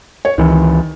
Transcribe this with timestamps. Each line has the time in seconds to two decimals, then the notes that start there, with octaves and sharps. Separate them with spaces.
0.25 C#5
0.38 C#2 D#3 E3